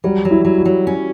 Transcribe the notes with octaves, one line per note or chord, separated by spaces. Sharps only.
F#3 G3
F#3
E4
F#3
F#4
F#3
C#4